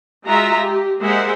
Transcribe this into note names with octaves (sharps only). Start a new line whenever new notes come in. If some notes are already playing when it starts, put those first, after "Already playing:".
G#3 F4 F#4 E5 A#5
G4
G#3 A#3 G#4 C5 E5 F#5